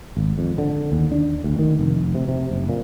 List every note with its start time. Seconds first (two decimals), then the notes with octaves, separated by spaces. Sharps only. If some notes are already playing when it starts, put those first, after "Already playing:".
0.17 G#1
0.38 F2
0.58 D3
0.92 D#2
1.12 D4
1.44 D2
1.59 D#3
1.79 F1
2.14 C3
2.28 C3
2.51 F#1
2.69 A#2